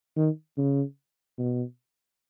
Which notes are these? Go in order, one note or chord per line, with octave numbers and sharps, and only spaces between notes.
D#3
C#3
B2